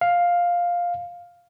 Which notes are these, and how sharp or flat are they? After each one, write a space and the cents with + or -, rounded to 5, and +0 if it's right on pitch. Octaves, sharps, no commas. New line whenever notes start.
F5 +5